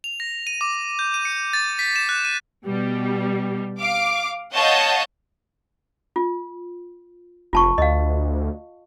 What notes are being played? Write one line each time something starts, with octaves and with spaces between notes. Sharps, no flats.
F7
A#6
D#7
D6
G6
D#7
C#7
A6
B6
E7
F#6
D#7
B2 G3
F5 D6
C#5 D#5 F5 F#5 A5 G6
F4
F1 F4 A5 C#6
D2 D#5 F5